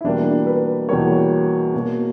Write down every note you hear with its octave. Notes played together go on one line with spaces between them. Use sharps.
E4
E2 B2 G3 A#3 D4
B4
E2 B2 G3 A#3 C#5
B2 A#3